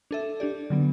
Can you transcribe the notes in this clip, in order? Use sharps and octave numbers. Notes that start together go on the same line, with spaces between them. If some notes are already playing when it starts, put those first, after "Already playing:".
D4 A4 E5
D4 G4 D5
D3 F#3 B3